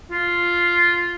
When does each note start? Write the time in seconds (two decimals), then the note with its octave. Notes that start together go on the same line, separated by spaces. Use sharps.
0.11 F4